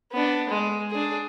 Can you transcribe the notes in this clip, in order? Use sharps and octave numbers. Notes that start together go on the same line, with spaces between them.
B3 D4
G#3
D4 G#4